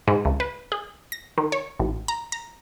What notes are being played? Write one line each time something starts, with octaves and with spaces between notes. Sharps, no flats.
G#2
C#2
B4
G#4
A#6
D#3
C#5
A1
A#5
A#5